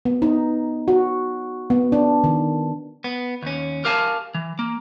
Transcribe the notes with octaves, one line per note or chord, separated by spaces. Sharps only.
B3
D#4
F#4
B3
D4
D#3
B3
D#2 C#4
G4 A#4 F5 G#5 A5
E3
A#3